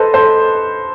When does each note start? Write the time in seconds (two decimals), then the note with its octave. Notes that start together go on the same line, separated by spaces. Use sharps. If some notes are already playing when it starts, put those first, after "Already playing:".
Already playing: A4 B4 C5 D#5
0.14 A4 C5